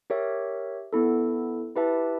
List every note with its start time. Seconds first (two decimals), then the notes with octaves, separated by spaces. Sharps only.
0.10 G4 A#4 C#5 E5
0.93 B3 E4 A4
1.76 E4 G4 B4 E5 A5